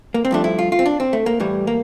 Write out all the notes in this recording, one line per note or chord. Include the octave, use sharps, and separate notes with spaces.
A#3
C4
G2 F3 A3 D4
E4
F4
F4
C4
D4
C4
A3
A#3
A2 E3 G3
A#3